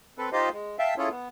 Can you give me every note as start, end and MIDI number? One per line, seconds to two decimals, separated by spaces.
0.18 0.30 60
0.18 0.30 69
0.18 0.30 71
0.33 0.49 63
0.33 0.49 65
0.33 0.49 67
0.33 0.49 72
0.33 0.49 75
0.33 0.49 77
0.53 0.76 56
0.79 0.94 76
0.79 0.94 77
0.79 0.94 79
0.79 0.94 81
0.98 1.09 61
0.98 1.09 64
0.98 1.09 65
0.98 1.09 68
0.98 1.09 69
0.98 1.09 73
1.11 1.28 59